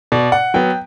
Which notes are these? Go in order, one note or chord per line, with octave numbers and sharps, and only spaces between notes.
B2 D5
F#5
F#3 B3 G5